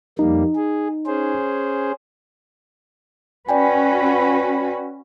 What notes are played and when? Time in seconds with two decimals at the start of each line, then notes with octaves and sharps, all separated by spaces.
0.19 F2 G3 A#3 D#4
0.55 G#4
1.07 C#4 G#4 C5
3.49 C#4 F#4 B4 D5 G5 G#5